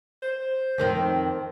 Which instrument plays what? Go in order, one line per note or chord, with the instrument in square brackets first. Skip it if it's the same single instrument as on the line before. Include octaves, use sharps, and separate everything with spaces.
[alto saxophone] C5
[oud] F2 D#3 C4